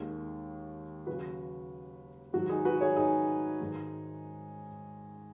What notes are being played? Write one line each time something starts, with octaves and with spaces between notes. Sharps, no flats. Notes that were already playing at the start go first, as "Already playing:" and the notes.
Already playing: D#2 D#3 G#3
D#2 C#3 F#3 F#4 B4
G#2 D#3 F#3 F#4
D#4 G#4
F#4 B4
G#4 C#5
D#4 G#4
G#2 D#3 G#3